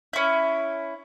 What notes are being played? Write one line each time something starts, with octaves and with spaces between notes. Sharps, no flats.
C#4 E4